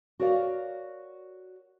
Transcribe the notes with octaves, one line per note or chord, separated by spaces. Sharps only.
F#4 A#4 C#5 D5 F5